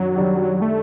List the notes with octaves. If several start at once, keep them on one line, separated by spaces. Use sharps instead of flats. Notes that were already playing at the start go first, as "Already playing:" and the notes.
Already playing: F#2 D#3 F#3 D4
D#3 G3 D4 G4
A3